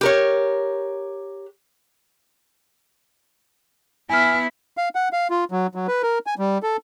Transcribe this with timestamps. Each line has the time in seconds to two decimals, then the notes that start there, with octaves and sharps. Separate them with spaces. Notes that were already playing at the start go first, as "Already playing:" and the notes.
0.01 G4 A#4 C#5
4.10 B3 E4 G#5 F6
4.77 F5
4.95 F#5
5.13 F5
5.30 F4
5.51 F#3
5.75 F#3
5.88 B4
6.03 A#4
6.27 G#5
6.39 G3
6.63 A4